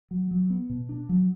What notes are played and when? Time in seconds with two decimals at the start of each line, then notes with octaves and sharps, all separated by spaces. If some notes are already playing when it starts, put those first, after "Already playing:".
0.11 F#3
0.31 F#3
0.50 B3
0.70 B2
0.89 D4
1.09 F#3